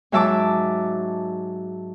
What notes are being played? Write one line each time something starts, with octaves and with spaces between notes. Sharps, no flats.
G#2 F#3 E5 A5 D6